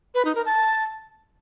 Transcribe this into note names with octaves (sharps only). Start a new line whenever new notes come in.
B4
D#4
A#4
A5